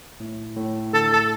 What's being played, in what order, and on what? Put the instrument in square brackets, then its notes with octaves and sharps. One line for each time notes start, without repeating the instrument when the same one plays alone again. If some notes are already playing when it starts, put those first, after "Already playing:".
[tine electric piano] A2
A2
[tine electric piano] D3 [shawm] A4
[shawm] A4